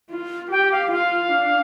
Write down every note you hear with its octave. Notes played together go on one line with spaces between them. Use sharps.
F4
G4 G5
F5
F4 F5
D4